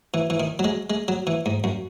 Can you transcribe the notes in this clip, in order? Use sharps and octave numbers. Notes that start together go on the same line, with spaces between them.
E3
E3
D#3
F#3
G#3
G#3
F#3
E3
G#2
F#2